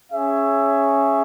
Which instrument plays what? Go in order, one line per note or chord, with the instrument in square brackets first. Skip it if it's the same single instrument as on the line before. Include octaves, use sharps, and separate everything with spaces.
[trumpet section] C#4 G#4 C#5 E5